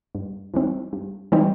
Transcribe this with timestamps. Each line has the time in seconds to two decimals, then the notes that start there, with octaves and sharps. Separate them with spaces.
0.15 G2
0.54 E3 G3 C4 D#4
0.93 G2
1.32 E3 G3 C4 D#4